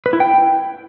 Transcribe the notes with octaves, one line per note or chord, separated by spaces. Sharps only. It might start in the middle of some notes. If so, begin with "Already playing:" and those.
B4
E4
G5